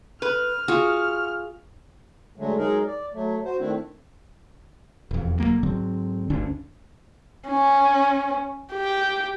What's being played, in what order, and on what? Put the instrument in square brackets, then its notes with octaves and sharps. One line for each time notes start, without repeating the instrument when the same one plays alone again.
[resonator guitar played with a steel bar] B4 [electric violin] F6
[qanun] F4 G#4 G#5 [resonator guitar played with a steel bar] F#4
[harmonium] D3 F#3 G#3 A3
F#3 G#3 D#4 G#4 A#4
D5
F#3 A3
F#4 C5
D#3 A3 C4 D4 E4
[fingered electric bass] E1 F2
F1 G2 F#3 A#3
G#2 D3 F#3 C4
G1 D2 C#4 D4
[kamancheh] C#4
G4